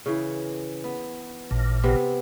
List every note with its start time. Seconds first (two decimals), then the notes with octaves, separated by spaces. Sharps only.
0.06 C#3 E3
0.84 B3
1.51 A1 A#2
1.83 C3 B3 C4